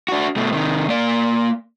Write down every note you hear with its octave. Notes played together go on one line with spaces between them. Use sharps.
D4 F#4
B2 A3
C3 D#3
A#3 D5